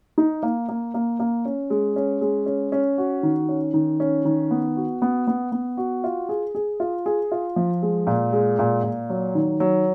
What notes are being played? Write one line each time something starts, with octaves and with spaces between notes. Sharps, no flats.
D#4
A#3
A#3
A#3
A#3
C#4
G#3
C#4
G#3
C#4
C#4
F#4
D#3
C#4
D#3
C#4
D#3
B3
F#4
B3
B3
B3
F#4
F4
G#4
G#4
F4
G#4
F4
F3
G#3
A#2
G#3
A#2
A#2
F#3
D#3
F#3